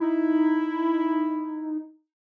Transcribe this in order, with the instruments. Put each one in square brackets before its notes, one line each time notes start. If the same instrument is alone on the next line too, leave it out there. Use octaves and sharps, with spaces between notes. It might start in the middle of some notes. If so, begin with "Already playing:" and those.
[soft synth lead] D#4 [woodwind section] E4